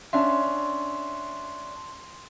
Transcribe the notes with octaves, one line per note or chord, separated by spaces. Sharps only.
C#4 D4 E5 C6